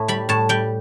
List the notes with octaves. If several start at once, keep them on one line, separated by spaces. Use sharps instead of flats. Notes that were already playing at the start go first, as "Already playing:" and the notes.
Already playing: A2
G3 B5
A2 A5
G3 G5